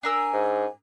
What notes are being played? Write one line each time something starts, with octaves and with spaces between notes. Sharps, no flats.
D4 A#4 G#5 E6
G#2